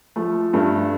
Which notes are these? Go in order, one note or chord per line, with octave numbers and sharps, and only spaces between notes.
F3 A3
G2 A3